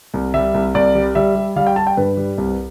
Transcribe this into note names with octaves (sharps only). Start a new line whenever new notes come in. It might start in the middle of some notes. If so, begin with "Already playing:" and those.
C2
G3 E5
C2
C2 D5
G3
G3 E5
G3
G3 F5
G5
G3 A5
G5
G2 B4
G3
C2